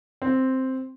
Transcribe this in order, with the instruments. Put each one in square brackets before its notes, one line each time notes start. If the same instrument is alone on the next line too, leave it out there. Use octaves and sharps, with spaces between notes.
[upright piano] C4